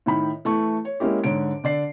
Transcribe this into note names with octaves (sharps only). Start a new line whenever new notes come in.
A2 D#3 B5
E3 A3 C#6
C#5
G#3 A#3 C#4 E4 G4
G#2 D3 C#5 D7
D3 D5 C7